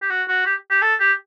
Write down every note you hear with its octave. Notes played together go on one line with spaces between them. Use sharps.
G4
F#4
F#4
G4
G4
A4
G4